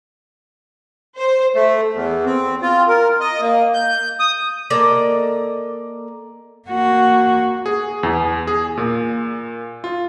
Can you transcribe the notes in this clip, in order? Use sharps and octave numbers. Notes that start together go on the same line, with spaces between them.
C5
A3
E2
C4
F4
A#4
D#5
A#3
G6
D#6
A#3 A4 D5 D#5
A#3 F#4
G#4
E2
G#4
A#2
F4